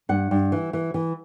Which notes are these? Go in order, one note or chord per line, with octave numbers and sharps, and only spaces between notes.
G2 F#5
G2
E3
E3
E3